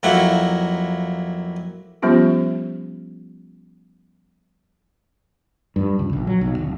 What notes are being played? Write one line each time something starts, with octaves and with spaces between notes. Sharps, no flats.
F2 F#3 A#3 E4 F#5
F3 G3 B3 C#4 F4 G4
G2
C#2
A#1
F#3
B1
D1